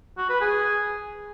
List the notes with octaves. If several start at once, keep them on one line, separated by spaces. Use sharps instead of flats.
F#4
B4
G#4